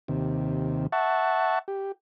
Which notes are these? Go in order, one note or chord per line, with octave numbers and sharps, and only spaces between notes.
D#2 C3
E5 F#5 A5 C#6
G4